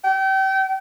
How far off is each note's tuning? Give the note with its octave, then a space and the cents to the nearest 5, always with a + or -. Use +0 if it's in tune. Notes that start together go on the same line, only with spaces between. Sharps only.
G5 -30